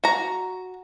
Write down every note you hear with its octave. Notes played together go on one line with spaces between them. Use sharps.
F#4 A#5